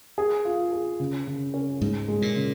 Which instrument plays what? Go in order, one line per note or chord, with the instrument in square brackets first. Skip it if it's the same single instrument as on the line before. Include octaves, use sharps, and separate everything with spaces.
[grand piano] G#4
F4
G#4
C#3
C#3
C#4
[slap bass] G#2 [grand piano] G#3
[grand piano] G#3
[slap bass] A#2
[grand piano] C#3